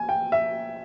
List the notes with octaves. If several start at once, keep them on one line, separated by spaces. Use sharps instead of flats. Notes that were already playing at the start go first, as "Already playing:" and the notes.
Already playing: G#5
G5
E5